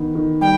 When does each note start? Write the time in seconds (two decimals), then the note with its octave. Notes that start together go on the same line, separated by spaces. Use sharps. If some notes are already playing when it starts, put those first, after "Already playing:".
Already playing: D#3 B3
0.15 D#3
0.41 G3 G5